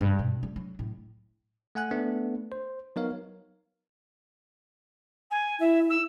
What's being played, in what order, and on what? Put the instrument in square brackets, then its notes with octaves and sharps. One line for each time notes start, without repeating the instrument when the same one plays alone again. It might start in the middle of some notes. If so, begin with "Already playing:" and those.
[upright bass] G2
B2
G3
F#3
A2
[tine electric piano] A3 F#5 G#5 F#6
A3 B3 D4
C5
F#3 B3 D#4 A#4 C#5 F5
[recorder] G#5
[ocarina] E4 [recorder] E5
[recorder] E6